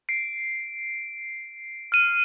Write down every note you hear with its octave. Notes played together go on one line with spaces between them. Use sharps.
C7 D7
F6 D#7